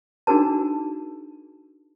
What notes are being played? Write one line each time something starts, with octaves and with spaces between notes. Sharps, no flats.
D4 D#4 F#4 G#4 A#4 A5